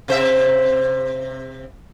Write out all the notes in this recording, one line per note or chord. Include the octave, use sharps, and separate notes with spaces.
C3 C5 E5